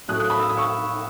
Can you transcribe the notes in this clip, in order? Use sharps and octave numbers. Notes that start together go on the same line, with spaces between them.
A2 F#3 A3 C#4 D#6 F#6
D#6 F#6
B5 D#6
E6
D#6
C#6 E6